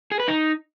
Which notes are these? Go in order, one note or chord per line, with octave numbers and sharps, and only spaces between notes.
G#4
B4
D#4